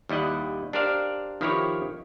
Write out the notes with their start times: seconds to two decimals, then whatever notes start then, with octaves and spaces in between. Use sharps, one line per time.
0.09 D#2 G3 E4 D#5 F#5
0.73 D4 G4 A#4 C5 D5 F5
1.41 D#3 F3 E4 G4 B4 C#5